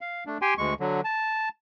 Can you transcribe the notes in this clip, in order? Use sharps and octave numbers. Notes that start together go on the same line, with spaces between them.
F5
A3 D4
G4 G5 G#5 C6
D2 G#3 C#6
D3 F#3
A5